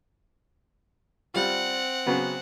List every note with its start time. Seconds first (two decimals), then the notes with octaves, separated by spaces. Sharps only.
1.34 G3 C4 F4 F#5
2.06 C#3 F#3 B3